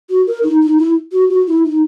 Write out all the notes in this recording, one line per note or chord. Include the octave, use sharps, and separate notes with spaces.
F#4
A#4
D#4
D#4
E4
F#4
F#4
E4
D#4